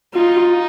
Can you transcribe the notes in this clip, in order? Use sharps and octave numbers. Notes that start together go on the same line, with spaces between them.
D#4 F4